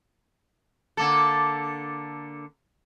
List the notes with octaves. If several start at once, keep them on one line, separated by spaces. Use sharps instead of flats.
D3 A#3 A4